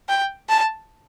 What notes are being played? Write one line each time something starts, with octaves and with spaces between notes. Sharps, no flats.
G5
A5